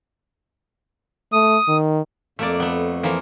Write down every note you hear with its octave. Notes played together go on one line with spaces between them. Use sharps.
A3 D#6
D#3
F2 A3 A#3 D5
A3 B3
E3 F3 A#3